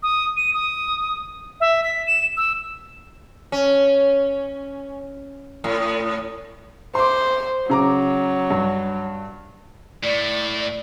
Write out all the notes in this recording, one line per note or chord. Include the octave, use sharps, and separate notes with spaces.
D#6
D#7
D#6
E5
B6
E7
E6
C#4
A2
C5 C6 D6
C#3 F#3 A#5 D6
G2
A2 D5